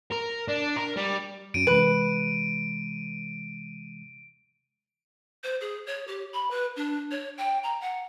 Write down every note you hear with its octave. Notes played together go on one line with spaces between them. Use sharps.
A#4
D4
A#4
G3
F#2 F#3 C#4 D7 D#7
C3 E3 G#3 B4
C5
G#4
C#5
G4
B5
B4
D4
C#5
G5
A#5
F#5